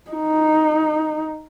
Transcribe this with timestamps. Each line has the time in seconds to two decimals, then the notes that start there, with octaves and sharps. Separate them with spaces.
0.11 D#4